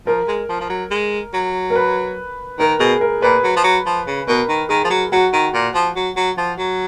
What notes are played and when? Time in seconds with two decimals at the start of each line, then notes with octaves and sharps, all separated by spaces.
0.06 F3 A#4
0.27 G#3
0.49 F3
0.61 F3
0.70 F#3
0.91 G#3
1.34 F#3
1.70 A#4
1.76 B4
2.59 D#3 A#4
2.80 B2 G#4
3.01 A#4
3.22 A#2 B4
3.44 F#3
3.56 F3
3.64 F#3
3.86 F3
4.07 C#3
4.27 B2 A#4
4.49 D#3
4.69 D#3 G#4
4.84 F3
4.90 F#3
5.12 F#3 F#4
5.33 D#3
5.54 A#2
5.75 F3
5.96 F#3
6.16 F#3
6.38 F3
6.58 F#3